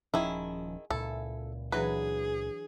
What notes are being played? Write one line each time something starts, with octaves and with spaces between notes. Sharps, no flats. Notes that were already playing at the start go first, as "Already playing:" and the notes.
D#1 D#3 F3 C#4 E4 G#4
C#2 A#2 E4 A4
E3 F#3 D4 G#4 B4